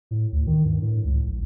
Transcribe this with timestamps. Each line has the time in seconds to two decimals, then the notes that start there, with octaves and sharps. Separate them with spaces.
0.11 A2
0.32 D2
0.47 D#3
0.65 G2
0.82 A2
1.04 C#2
1.27 A#1